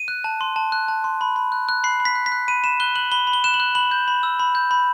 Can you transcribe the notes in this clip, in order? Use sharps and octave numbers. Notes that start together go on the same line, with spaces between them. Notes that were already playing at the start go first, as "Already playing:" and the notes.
Already playing: D#7
F#6
A5
C6
A5
F#6
A5
C6
B5
B5
F#6
F#6
B5 C7
B5
B6
F#6
B6
F#6
B5 D#7
B5 E7
F#6 G7
F#6 F#7
B5 G7
B5
G7
F#6 E7
F#7
F#6
B5 F#7
G6
B5
E6
B5
G6
B5